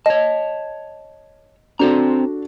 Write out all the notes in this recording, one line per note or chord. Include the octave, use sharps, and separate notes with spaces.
C#5 D#5 A5
C4 D4 F#4 A4 C5 A#5